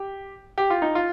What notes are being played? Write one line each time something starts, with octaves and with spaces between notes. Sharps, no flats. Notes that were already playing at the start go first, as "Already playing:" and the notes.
Already playing: G4
G4
F4
D#4
F4